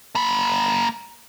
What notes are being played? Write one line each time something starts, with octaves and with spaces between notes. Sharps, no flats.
A#3 B5